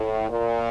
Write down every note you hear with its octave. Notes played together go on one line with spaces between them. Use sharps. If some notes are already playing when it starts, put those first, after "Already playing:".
Already playing: A2
A#2